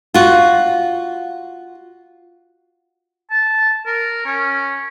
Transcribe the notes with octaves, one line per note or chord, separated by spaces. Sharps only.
F4 F#4
A5
A#4
C#4